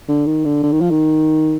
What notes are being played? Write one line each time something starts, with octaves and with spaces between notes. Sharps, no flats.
D3
D#3
D3
D3
D#3
F3
D#3